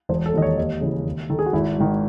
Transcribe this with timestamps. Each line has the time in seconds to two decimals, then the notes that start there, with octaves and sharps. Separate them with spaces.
0.09 E1 C5
0.26 A4
0.33 D#2 D#3 D#5
0.42 C#5
0.57 D#2 D#5
0.81 C#3 E3
1.05 D#2
1.30 D#3 A4
1.39 G#4
1.46 F#4
1.53 G#1 E4
1.78 G#2 D#3